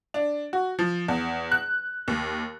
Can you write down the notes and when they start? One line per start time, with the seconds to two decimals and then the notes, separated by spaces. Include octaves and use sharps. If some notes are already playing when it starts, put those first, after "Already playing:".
0.14 D4
0.53 F#4
0.79 F3
1.08 E2
1.52 F#6
2.08 D#2